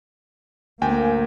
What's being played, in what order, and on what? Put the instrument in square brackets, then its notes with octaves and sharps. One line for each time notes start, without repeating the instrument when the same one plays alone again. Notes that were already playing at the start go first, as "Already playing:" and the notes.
[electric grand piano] D2 G5 G#5 [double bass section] A#3